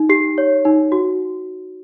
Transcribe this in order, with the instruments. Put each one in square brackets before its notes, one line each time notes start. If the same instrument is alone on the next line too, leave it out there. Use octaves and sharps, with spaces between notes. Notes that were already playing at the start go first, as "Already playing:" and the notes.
Already playing: [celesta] D#4
G4 C7
C#5
D#4
F#4